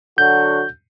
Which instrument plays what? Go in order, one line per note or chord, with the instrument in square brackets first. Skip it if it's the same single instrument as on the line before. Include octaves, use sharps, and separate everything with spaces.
[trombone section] D3 F#3 F#4 [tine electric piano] G6